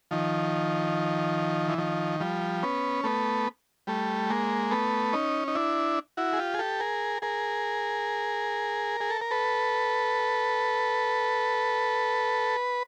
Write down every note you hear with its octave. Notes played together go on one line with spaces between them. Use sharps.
D#3 F3
E3
D#3 F3
F3 G3
B3 C#4
A3 B3
G3 A3
G#3 A#3
A3 B3
C#4 D#4
D#4
D4 E4
E4 F#4
G#4
F4 G4
G#4
G4 A4
G#4 A#4
G#4 A#4
G#4
A4
A#4
A4 B4